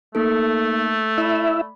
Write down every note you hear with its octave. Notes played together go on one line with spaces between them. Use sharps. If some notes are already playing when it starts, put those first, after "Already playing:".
A3 A#3 D#4 A4
E4 D5 E5 B5